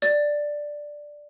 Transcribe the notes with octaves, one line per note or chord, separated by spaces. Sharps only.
D5